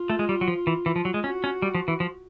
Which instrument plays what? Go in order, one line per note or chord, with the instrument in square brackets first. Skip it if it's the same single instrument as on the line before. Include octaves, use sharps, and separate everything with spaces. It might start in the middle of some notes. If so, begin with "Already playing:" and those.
Already playing: [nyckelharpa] F4
[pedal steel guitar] A3
G#3
G3
F#3
F3
E3
E3
F3
F#3
G#3
[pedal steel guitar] C#4 [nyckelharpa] F#4
[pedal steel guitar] C#4
G3
F3
E3
F3